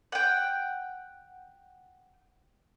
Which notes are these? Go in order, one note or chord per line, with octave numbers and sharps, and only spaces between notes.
F#5 G5